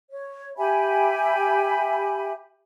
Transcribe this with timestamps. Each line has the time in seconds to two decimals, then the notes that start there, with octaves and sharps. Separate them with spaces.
0.09 C#5
0.57 G4 E5 G#5 B5